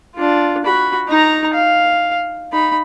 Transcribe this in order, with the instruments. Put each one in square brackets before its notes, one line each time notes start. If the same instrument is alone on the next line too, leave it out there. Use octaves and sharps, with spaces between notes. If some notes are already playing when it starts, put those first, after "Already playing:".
[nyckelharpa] D4 F4
F#4 B5
D#4 A#5
F5
D#4 B5